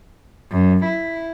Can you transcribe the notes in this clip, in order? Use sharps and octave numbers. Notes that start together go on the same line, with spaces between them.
F#2
E4